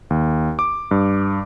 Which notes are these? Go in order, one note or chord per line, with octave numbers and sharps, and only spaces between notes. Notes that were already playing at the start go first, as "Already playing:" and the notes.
D#2
D6
G2